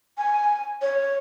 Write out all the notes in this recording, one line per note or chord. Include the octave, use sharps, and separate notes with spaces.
G#5
C#5